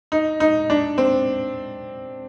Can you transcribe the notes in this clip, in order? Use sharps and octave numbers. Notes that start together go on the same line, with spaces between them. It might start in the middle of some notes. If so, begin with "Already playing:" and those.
D#4
D#4
D4
C4